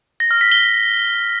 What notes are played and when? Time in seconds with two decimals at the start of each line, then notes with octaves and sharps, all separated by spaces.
0.20 A#6
0.31 F6
0.41 B6
0.52 G7